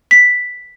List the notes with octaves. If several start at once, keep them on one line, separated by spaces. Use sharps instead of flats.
B6